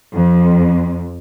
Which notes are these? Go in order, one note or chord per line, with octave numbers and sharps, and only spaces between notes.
F2